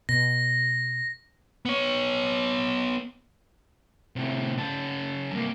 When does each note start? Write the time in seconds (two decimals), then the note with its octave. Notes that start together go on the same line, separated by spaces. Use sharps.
0.09 B2 A#6
1.65 B3 C#5
4.16 A2 C3
4.58 C#3 A5
5.32 C2 A#3